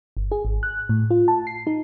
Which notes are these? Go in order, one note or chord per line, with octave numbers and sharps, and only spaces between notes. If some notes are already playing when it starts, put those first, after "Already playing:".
G1
G#4
G#1
F#6
A2
F4
A5
C7
D#4